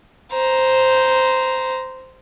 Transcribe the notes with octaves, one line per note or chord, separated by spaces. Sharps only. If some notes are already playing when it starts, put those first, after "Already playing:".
C5 A#5